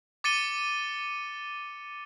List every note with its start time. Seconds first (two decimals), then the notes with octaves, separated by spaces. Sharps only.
0.24 D6 A6 C#7 D#7 G7